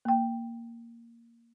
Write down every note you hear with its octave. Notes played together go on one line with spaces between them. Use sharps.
A#3 G5